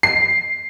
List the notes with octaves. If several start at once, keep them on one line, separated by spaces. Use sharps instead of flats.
C7